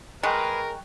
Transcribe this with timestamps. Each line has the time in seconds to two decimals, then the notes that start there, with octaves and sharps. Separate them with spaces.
0.23 G#3 G#4 A#4 B4 G5 C#6 F#6